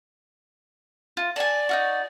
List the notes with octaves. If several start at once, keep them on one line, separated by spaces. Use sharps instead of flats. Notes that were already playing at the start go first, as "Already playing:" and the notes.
F4
D5 G#5 A5
D#4 F4 F#4